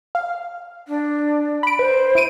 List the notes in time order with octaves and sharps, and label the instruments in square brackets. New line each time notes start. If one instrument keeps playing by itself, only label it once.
[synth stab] F5
[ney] D4
[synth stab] B5 D7
[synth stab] B4 [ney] C5
[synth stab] E4 D7 D#7